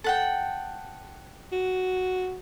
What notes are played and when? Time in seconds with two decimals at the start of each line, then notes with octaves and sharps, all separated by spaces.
0.04 A4 F#5 G5
1.52 F#4